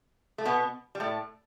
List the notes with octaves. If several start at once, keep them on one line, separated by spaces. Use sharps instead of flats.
A3
B2 B3
G3
A2 A3